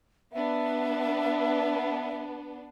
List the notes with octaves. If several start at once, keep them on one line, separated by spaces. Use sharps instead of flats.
B3 D4 E5